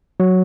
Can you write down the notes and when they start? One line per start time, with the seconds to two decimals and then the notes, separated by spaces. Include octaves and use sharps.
0.20 F#3